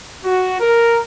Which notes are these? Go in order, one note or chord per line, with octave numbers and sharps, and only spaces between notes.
F#4
A#4